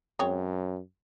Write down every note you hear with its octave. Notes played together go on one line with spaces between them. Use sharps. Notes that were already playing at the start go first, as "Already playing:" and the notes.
F#2 G#3 C4 C#5